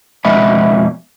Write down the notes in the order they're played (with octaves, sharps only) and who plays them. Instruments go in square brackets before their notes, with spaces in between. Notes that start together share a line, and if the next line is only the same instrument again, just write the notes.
[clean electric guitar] F2 B2 G#3 D#5 E5 B5